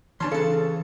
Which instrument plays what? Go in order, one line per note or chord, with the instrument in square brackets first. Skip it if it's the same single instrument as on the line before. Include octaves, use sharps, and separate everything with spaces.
[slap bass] E3 [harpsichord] C#4 [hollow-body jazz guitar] D4 A5 C6
[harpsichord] C#3 A5 [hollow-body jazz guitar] A4